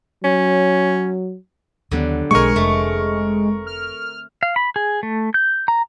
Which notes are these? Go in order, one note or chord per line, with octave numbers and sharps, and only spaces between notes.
F#3 C#4
D#2 D3 F#3 G3 B3
B1 B2 G#3 C4 A#4 G5 G#5 C#6
F1 G#3 A3
F6
F5
B5
G#4
A3
G6
A#5